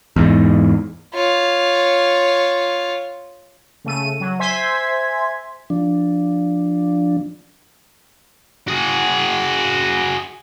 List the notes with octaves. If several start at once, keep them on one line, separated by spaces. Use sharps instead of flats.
E2 G#2
F4 C#5
C#3 A3 D#7
F#3
C5 E5 G#5 C6 G#6 B6
F3 D4
F#4 G#4